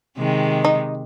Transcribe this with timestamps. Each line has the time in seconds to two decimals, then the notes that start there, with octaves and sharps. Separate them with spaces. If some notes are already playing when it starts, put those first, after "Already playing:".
0.18 C3 D#3 G#3
0.65 D#4